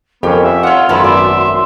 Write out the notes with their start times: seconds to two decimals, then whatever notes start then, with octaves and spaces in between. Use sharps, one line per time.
0.23 F2 B3 C#4 G4 A#4
0.43 E5 F5
0.63 F4 C#5 F#5
0.89 G#1 F#2 A#2 B3 E4 A4 B4 C6
1.04 D5 E5